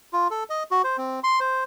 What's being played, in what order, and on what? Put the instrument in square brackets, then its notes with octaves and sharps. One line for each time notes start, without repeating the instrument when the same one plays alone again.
[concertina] F4
A4
D#5
F#4
C5
C4
C6
C5